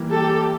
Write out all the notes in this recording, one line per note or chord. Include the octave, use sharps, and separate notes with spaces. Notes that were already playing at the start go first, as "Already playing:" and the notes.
Already playing: E3 G3 A#3
G4 A4